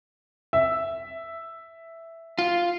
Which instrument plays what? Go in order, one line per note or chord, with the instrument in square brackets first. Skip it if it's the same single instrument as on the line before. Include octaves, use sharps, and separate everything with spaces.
[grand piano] E5
[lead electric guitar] F4